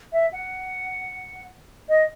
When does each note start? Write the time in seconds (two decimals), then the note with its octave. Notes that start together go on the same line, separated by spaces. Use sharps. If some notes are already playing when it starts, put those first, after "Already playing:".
0.13 E5
0.33 F#5
1.89 D#5